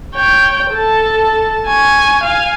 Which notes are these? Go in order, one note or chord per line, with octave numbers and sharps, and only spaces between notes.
C#5 G5
A4 A5
G#5 C#6
F5 G#5